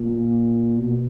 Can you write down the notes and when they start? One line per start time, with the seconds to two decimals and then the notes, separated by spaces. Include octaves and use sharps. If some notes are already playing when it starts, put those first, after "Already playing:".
Already playing: A#2
0.76 B2